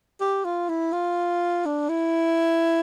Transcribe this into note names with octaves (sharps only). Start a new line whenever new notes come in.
G4
F4
E4
F4
D4
E4